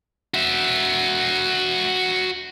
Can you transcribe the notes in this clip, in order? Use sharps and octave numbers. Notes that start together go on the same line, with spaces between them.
F#4 E5